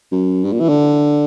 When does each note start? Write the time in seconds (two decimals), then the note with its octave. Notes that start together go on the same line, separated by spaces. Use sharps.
0.11 F#2
0.44 G2
0.52 A#2
0.60 E3
0.69 D3